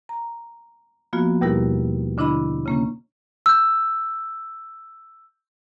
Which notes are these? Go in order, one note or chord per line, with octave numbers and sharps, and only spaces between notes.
A#5
F3 A#3 B3 F4 F#4
D#2 B2 G3 E4 G4 A#4
D3 D4 E4 D#5 B5
C#3 A#3 C#4
E6 G6